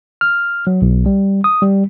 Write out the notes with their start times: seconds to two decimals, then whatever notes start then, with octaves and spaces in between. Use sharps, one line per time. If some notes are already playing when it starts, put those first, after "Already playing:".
0.21 F6
0.67 F#3
0.82 B1
1.06 G3
1.44 D#6
1.62 G3